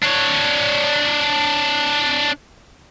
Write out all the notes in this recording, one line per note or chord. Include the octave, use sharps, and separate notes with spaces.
D4 C#5